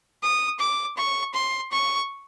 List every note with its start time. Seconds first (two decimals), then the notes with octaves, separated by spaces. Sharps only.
0.23 D#6
0.60 D6
0.97 C#6
1.34 C6
1.72 C#6